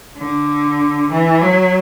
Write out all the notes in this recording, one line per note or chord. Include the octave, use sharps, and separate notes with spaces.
D3
E3
F#3